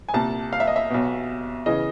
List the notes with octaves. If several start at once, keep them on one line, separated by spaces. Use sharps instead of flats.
G#5
C2 A#2 A5
F5
E5
D#5
E5
B1 B2
C#3 E3 D#5